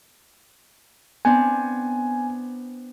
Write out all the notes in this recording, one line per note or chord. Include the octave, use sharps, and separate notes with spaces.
B3 C4 D4 G#5